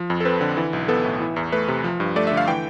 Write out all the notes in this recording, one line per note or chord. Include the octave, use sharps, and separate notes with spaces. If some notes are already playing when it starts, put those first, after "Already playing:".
Already playing: F3
F2
A4
C4 B4
D3
E3
B1
B3 A4
A2
E3
E2
A3 B4
C3
F3
G2
A3 D5
E5
D3
F5
E3 G5